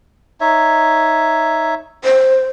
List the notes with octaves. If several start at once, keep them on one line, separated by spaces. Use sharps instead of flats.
D#4 C#5 E5
C5